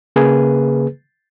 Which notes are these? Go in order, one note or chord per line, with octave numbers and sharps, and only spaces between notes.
C#3 A#3 G#4 B4